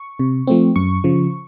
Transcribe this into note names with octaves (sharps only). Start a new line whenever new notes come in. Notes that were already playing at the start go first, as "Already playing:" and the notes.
Already playing: C#6
C3
F3 A3 C4
F#2 C#6
C#3 F3